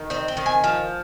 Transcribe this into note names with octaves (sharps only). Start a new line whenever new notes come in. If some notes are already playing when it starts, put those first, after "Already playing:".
Already playing: D#3
C4 D#5
G5
D#3
G#5
F3